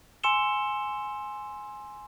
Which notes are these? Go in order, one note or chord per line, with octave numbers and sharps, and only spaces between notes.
G#5 C6 E6 C#7 E7 G7